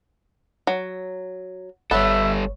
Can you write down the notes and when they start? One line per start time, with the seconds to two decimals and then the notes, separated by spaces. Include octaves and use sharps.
0.67 F#3
1.91 G1 G3 B3 A4 C#5 E5